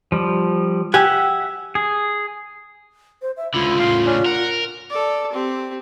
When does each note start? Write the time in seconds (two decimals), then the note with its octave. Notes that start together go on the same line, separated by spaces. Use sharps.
0.12 F3 G3
0.94 G4 E5 F#5 G#5
1.75 G#4
3.22 C5
3.37 E5
3.54 C#2 D3 E4 F4
3.79 A2 C#3 F5 C6
4.05 C#4 D4
4.25 A#4 F#5
4.90 A4 D5
5.33 C4 G4